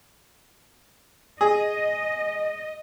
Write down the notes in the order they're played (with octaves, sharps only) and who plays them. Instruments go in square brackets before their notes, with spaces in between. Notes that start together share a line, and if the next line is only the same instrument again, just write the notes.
[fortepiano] G#4 [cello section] D#5